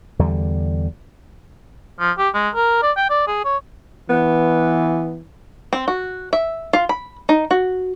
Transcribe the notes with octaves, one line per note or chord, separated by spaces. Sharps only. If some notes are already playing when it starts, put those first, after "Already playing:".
E2 D3 G3
F3
G4
G#3
A#4
D5
G5
D5
G#4
C#5
E3 B3
C4
F#4
E5
F4
B5
D#4
F#4